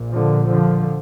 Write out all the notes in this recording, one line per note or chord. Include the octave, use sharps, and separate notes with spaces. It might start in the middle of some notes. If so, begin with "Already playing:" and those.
Already playing: A#1 A#2
D3 F3
D3 F3